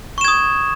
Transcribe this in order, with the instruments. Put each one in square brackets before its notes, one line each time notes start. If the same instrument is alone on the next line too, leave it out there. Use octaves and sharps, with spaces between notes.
[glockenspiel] C#6
E7
G#6
D#6